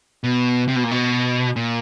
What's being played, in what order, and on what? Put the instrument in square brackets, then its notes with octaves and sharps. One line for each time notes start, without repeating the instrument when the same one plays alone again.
[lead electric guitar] B2
C3
B2
A#2
B2
A#2